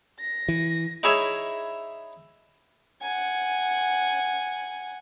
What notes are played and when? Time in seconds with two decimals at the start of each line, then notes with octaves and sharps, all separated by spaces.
0.19 A#6
0.48 E3
1.03 D#4 E4 G#4 C#5 E5
3.02 F#5 G#5